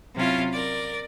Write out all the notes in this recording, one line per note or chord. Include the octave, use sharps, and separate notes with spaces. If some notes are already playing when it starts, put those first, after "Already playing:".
C3 F#3 C#4 E4 F4
A#4 D5